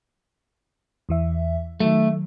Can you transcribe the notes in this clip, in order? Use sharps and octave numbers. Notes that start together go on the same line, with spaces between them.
E2 E3 E5
D#3 F#3 A3